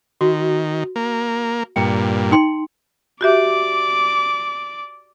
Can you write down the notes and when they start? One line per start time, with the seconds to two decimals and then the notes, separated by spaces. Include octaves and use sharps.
0.21 D#3 F#4
0.96 A#3
1.76 G2 A#2 G5 A#5
2.32 D#4 G5 C6
3.21 F#4 G4 D5 E5 D6